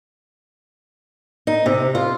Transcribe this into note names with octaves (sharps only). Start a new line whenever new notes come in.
D#4
C3
F4